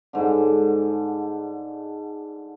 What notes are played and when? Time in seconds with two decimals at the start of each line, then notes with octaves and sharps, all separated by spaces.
0.13 G#2 D3